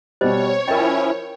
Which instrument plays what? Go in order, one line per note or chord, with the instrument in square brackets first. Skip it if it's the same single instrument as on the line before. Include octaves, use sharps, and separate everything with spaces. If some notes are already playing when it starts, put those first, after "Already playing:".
[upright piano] B2 G3 [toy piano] C5 D#5 [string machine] C#5
[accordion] F3 C#4 E4 [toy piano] A#4 D#5 [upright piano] G5